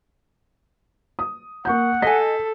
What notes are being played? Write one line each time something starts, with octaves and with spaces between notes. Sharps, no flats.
D#6
A#3 F#5 C#6 G6
A4 D#5 G#5 B6